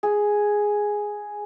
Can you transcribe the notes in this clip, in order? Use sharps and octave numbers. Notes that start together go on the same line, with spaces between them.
G#4